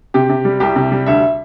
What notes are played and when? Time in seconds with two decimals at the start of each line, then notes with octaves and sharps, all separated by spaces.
0.14 C3 G4
0.29 C3
0.45 G3
0.60 C2 G4
0.76 C3
0.92 G3
1.06 D2 E5